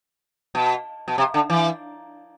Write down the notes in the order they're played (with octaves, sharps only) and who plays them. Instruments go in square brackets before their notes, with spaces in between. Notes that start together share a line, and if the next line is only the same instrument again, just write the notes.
[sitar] B2
B2
C3
D3
E3